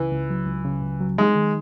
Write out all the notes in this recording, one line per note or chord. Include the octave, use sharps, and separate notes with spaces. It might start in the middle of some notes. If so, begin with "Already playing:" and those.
Already playing: C#2 C#3 E3
C#2
F#3
C#2
C#3
C#2
F#3
G#3 D#4
D#3